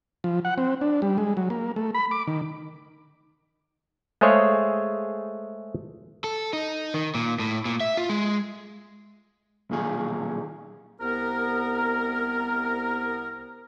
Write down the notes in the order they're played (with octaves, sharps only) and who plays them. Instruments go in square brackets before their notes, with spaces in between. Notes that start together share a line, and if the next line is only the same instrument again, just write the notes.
[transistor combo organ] F3
F#5
C4
D4
G3
G#3
F#3
A#3
A3
B5
D6
D#3
[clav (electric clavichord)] G#3 A3 G#4 C5 C#5 F5
[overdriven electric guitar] A4
D#4
D#3
A#2
A2
A#2
E5
F4
G#3
[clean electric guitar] B1 A#2 D#3 G#4
[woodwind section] C2 B3 A#4